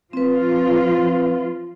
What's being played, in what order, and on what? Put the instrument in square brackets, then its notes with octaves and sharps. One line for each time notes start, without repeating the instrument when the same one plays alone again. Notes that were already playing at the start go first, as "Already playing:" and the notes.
[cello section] F3 F4 [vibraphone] C4 B4